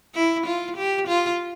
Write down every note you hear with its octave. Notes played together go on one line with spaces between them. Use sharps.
E4
F4
G4
F4